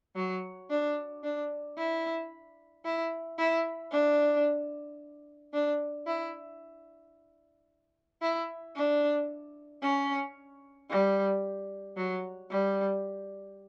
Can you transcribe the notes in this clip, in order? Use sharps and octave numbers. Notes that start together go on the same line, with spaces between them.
F#3
D4
D4
E4
E4
E4
D4
D4
E4
E4
D4
C#4
G3
F#3
G3